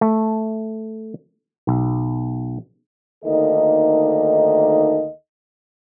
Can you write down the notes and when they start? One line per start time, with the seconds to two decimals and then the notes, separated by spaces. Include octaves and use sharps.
0.01 A3
1.67 B1
3.25 D2 D#3 A#3 D#4 A4 D#5